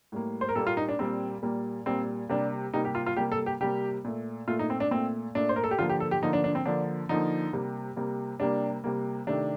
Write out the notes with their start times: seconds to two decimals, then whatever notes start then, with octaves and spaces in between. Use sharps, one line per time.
0.12 A2 G3 A#3
0.41 C5
0.49 A#4
0.55 A#2 G3 A#3 A4
0.67 F4
0.77 D#4
0.89 D4
0.99 A#2 G3 A#3 C4
1.43 A#2 G3 A#3
1.86 A#2 G3 A#3 C4
2.29 C3 G3 A#3 D4
2.74 C3 G3 A#3 D#4
2.85 G4
2.95 F4
3.06 F4
3.17 C3 G3 A#3 G4
3.32 A4
3.46 G4
3.60 C3 G3 A#3 G4
4.05 A#2 A3
4.48 A#2 A3 F4
4.59 D#4
4.70 C4
4.80 D4
4.91 A#2 A3 C4
5.35 A#2 A3 D4
5.49 C5
5.56 A#4
5.64 A4
5.71 G4
5.78 D3 F3 A#3 F4
5.90 G4
6.00 A4
6.11 G4
6.22 D3 F3 A#3 D#4
6.33 D4
6.44 D4
6.55 C4
6.65 D3 F3 A#3 D4
7.09 D3 F3 A#3 D#4
7.53 C3 G3 A#3
7.96 C3 G3 A#3
8.40 C3 G3 A#3 D4
8.84 C3 G3 A#3
9.27 C3 D#3 A3 D4